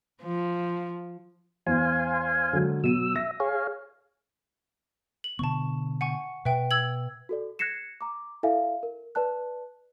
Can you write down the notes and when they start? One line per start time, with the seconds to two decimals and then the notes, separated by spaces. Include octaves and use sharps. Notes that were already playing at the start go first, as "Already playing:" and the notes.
0.23 F3
1.66 E2 C5 F5 G#5
2.53 D3 F#3 G#3
2.84 B2 F#3 E6 D#7
3.16 E5 A#6
3.40 G#4 C#5 F5
5.24 F#7
5.39 B2 D3 B3 A5 C#6
6.01 F#5 G#5 C#6
6.45 B2 B4 E5 G5
6.71 E6 G#6 F#7
7.29 F#4 A4 D5
7.59 F#6 G#6 A#6 C7 C#7 E7
8.01 A#5 D6
8.43 E4 A4 E5 F5 G#5
8.83 A#4
9.15 B4 D5 A5 F#6